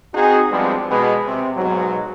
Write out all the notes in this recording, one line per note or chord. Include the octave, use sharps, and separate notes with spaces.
C4 D#4 F#4 G#4
F3 G3 G#3 B3 C4 D4
B2 G#3 B3
C3
B1 G#2 B2 F#3